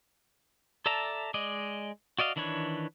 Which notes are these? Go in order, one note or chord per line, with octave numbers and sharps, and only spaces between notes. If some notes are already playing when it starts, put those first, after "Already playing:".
A4 D5 E5 A5 A#5
G#3 D5 D#5
F#4 D5 D#5 F5
D#3 E3 D4 B4 C#5